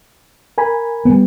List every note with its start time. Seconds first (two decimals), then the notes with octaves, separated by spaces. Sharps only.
0.58 A#4 G#5 B5
1.05 G3 B3